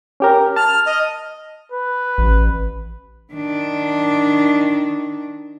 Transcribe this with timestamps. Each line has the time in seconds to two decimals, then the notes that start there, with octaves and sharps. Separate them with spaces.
0.20 C#4 G4 A#4
0.56 A5 F6
0.86 D#5
1.72 B4
2.18 A1
3.33 D#3 D4